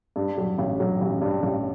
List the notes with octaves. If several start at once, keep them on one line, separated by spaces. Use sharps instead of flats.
G2
F#3
A1
F#3
A1
G2
A1